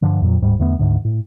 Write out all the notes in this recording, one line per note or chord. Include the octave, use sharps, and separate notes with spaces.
G2 D3 F3
F2 A#2 F#3
D1 G#2 G3
E2 D3 A3 B3
D2 G#2 D3
A2